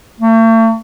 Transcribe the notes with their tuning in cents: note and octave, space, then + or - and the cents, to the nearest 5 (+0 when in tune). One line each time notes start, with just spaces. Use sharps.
A3 +40